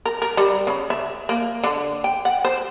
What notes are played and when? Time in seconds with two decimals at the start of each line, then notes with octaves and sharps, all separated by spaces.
0.05 A#4
0.22 A#4
0.37 G3
0.67 C#3
0.90 E5
1.29 A#3
1.63 D3
2.04 G5
2.25 F#5
2.44 C5